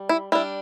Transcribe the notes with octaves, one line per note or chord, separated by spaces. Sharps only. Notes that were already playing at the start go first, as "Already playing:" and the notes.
Already playing: G3
E4
G3 D4 E4